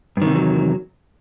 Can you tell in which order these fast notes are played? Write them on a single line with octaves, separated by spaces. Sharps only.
G2 D#3 C3 E2 F#3